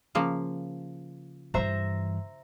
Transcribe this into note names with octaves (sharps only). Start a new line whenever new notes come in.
C#3 F3 A#3
G2 E3 C5 E5 A#5